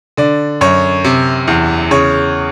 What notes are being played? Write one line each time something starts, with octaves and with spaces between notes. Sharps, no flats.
D3 D5
F#2 C#5
C3
E2
C#3 C#5